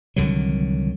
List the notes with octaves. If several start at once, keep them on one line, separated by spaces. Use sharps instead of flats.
C2 D3 D#3 F#3